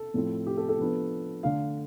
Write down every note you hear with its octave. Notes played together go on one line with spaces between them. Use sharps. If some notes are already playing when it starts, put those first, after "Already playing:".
Already playing: A4
A2 F3 A3 C4
G4
A4
A4
F3 B3 D4
D3 A3 D4 F5